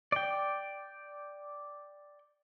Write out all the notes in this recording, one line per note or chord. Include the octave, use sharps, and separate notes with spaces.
D5 G5